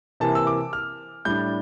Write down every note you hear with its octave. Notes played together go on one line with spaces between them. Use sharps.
C3 E3 A#3 A5
E6
D6
F6
A2 G3 D4 G6